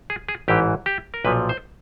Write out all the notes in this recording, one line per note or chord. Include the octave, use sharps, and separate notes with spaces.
G#4
G#4
A1 G#2 E3 G4
G4
A#4
B1 A#2 F3 B4
C5